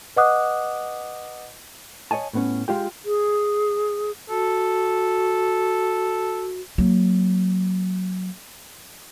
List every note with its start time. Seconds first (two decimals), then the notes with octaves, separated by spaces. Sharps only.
0.16 B4 D#5 F#5 D6 D#6 F#6
2.11 C#5 D#5 G#5 A5
2.33 A2 B3 C#4
2.68 G#3 F4 G4 G5
3.05 G#4
4.30 F#4 A4
6.78 F#3 A#3